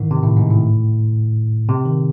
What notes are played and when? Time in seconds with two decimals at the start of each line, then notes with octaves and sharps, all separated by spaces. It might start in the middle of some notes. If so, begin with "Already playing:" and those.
Already playing: G#2 D#3 E3
0.11 C3
0.23 A2
0.37 G#2
0.50 A2
1.69 C3
1.86 D#3